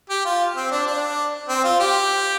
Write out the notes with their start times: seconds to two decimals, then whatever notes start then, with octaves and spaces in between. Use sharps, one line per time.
0.10 G4
0.25 F4
0.56 C4
0.71 D4
0.87 D4
1.49 C4
1.64 F4
1.80 G4